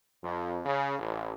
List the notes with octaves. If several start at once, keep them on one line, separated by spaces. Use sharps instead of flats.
F2
C#3
A1